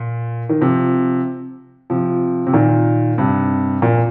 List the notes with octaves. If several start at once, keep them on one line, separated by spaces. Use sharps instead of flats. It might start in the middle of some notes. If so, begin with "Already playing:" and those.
Already playing: A#2
D#3
C3 F3
C3 F3
C3
A#2 D#3
G2 C3
A#2